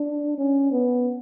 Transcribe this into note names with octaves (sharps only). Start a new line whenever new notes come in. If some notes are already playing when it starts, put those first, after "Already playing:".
Already playing: D4
C#4
B3